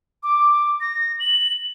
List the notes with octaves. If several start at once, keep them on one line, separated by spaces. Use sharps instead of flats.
D6
A#6
F#7